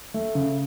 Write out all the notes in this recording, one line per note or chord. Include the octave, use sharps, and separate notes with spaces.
A3
C#3